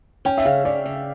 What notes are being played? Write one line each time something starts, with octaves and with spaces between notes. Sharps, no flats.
C#4 G5
E5
C#3 F5
C#3 D5
C#3